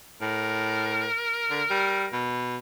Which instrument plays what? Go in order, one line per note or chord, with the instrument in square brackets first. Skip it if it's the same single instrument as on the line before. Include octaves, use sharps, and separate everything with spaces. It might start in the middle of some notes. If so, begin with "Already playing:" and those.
[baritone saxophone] A2 [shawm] A#4
[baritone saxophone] D3
G3
B2